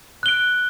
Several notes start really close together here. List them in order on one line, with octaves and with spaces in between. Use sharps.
F#6 G7 D7